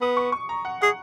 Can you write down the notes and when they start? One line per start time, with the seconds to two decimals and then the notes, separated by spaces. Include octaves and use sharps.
0.01 B3 D#6
0.17 C#6
0.32 C#6
0.49 A#5
0.65 F#5
0.81 G#4 F#5